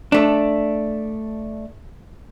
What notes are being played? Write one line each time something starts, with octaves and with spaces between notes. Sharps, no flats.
A3 D4